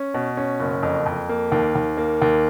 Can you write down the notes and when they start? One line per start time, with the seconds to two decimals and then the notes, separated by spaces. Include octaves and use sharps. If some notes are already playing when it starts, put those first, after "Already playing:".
Already playing: C#4
0.14 B2
0.37 C#4
0.60 F#1
0.83 F2
1.06 F2
1.29 A#3
1.52 D#2
1.75 D#2
1.97 A#3
2.22 D#2